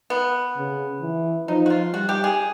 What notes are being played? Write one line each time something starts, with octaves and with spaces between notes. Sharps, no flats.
B3
C#3
E3
F3 D#4
F#4
F4
G3 F#4
G4
G#4